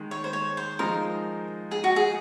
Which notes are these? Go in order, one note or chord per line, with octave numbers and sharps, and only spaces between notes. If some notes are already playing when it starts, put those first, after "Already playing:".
Already playing: D#3 G#3
C#5
C5
C#5
C5
F3 G#3 D#4 A#4
G#4
F#4
G#4